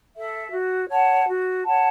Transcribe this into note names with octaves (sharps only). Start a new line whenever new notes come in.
A4 E5
F#4
C#5 F#5 A5
F#4
C#5 F#5 A5